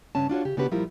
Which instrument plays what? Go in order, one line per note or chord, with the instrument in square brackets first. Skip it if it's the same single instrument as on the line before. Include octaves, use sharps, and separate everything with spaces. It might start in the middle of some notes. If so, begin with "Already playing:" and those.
[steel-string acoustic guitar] G2 C#3 C#4 A5
D4 F4 F#4 C#5
C#3 G4
C#3 B3 D4 F#4 G4 B4
A#2 F3 G3 E4 F4 A#4